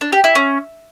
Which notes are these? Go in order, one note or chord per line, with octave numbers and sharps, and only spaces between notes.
D4
G4
E4
C#4